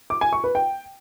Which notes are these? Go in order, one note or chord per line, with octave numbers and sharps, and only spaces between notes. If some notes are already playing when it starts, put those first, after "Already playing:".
D6
G#5
C#6
B4
G5